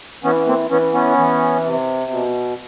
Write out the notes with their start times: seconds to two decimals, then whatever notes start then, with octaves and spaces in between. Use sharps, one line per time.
0.23 E3 B3 C#4
0.47 A#3 C4
0.70 E3 B3 C#4
0.94 B3 C#4
1.18 E3
1.65 C3
2.11 B2